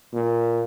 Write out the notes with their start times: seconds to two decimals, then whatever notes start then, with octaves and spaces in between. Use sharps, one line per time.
0.14 A#2